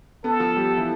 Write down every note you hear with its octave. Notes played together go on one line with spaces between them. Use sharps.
B3 A4
F3 F4
G3 G4
E3 E4